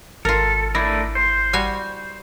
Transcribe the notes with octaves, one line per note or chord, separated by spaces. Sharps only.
G#1 F4 A4 A#4
A3 D4 E4 A#4
C5
G3 F#4 G#5